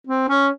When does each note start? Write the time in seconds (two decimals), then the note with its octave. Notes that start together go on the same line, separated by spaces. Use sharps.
0.07 C4
0.29 C#4